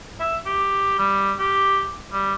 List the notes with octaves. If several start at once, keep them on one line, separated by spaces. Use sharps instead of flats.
E5
G4
G3
G4
G3